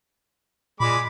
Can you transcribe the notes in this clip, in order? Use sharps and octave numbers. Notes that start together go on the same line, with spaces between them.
A#2 G#3 B5 D6